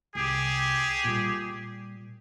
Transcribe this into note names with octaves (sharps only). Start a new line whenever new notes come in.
C2 G4 G#4
A#2 G3